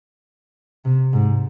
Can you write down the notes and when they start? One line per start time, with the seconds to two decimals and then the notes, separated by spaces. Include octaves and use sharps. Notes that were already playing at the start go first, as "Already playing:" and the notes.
0.85 C3
1.13 G#2